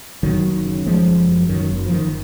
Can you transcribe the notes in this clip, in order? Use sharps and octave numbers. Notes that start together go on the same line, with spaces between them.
F#1 D#3 F#3
F#1
C#3
F#1 F3 G#3
F#1
F#2
F#2 D#3 F#3
F#1
F3
F#1 D#3